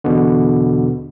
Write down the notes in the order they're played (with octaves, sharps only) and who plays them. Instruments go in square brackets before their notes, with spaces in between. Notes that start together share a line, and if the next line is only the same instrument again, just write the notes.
[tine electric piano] E2 B2 D3